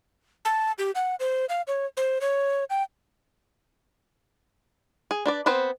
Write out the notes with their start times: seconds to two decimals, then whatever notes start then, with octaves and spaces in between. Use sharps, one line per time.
0.45 A5
0.78 G4
0.95 F#5
1.20 C5
1.49 F5
1.67 C#5
1.97 C5
2.21 C#5
2.70 G5
5.11 G#4
5.26 D4 B4 D5
5.46 B3 C4 B4 C5